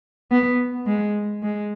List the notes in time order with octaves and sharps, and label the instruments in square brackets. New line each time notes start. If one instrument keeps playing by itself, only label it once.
[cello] B3
G#3
G#3